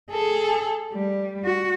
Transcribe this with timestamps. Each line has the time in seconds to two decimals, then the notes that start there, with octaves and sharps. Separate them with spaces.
0.11 G#4 A4
0.92 G3
1.45 F#4